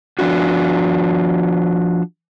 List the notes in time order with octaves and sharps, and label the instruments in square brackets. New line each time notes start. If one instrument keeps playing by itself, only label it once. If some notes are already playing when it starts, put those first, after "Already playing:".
[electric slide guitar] F3 D4 F#4